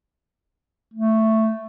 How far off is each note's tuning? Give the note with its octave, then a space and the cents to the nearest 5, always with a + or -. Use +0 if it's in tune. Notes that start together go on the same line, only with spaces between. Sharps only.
A3 +5